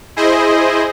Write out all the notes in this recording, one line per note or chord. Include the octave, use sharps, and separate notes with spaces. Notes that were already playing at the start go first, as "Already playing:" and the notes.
E4 G#4 C5 D#5